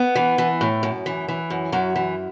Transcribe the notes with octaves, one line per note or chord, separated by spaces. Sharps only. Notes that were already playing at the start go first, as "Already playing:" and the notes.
Already playing: B3
E3
E3
A2
F#2
E3
E3
F#2
F#2 F#3
E3